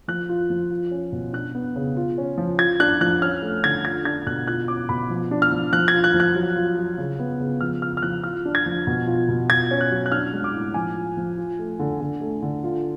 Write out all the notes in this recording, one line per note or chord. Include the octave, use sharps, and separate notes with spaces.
F3 F#6
F4
F3
F4
C#4
B2
D4 F#6
B3
C#3
F4
C#4
F3
F4 G#6
D4 F#6
F3 F#6
C#4 F6
A3
D3 G#6
F4 G#6
D4 G#6
B2 F#6
F4 F#6
C#4 D6
B2 B5
F3
D4
F6
F3
F3 F#6
G#6
F4
F#6
F3
F#6
F#3
F4
F#3
C#3
B3
C#3
F3 F6
F4 F6
F6
F3 F#6
F4 F6
D4
G#6
F3
B2
F4
B2
F4 G#6
C#4
F#6
F#3
F#6
D4 F6
G#3
D6
A2
F3 G#5
F4
F3
F4
A3
D3
D3
A3
D3
F4